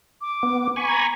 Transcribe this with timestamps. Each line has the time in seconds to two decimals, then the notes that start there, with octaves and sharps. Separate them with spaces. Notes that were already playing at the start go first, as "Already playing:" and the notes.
0.21 D6
0.43 B3
0.76 G#5 B5 C#6
0.88 A#5